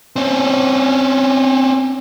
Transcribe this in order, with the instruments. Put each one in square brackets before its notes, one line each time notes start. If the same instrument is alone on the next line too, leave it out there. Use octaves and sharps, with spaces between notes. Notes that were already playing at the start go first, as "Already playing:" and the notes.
[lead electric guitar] C4 C#4